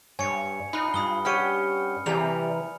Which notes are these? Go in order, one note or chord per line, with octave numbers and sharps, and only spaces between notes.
G2 C#5 G#5 C#7
D#4 F4 B5 F#6
G2 B5 D#6 G7
C#4 G4 F#5 F6 C#7 D#7
C3 E3 G3 A#3 G#5 F7